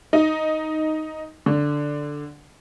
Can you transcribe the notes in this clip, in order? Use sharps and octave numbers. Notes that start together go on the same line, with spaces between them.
D#4
D3